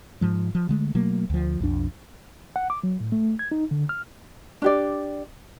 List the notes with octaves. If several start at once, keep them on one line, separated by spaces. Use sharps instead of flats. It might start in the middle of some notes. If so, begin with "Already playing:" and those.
G#2 F3 G#3
F3
D3 G#3 A3
B2 F#3 A3 A#3
D2 F3
B1 F2 D4
F#5
D6
F#3
A2
A3
G#6
D#4
D3
F6
D4 G4 D5